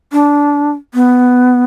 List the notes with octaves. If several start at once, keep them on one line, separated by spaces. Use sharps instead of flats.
D4
B3